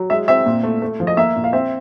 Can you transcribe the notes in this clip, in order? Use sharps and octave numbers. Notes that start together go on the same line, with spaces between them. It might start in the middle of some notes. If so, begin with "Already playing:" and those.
Already playing: F#3
G#3 E5
C4 E5
A#2
A3
A3
F3
D#5
A#3 E5
A#2
F5
C4 E5